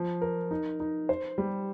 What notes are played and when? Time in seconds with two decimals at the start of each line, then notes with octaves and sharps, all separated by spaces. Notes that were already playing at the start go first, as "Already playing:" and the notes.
Already playing: F3
0.22 A#4
0.51 D#4
0.80 D#4
1.09 C5
1.38 G3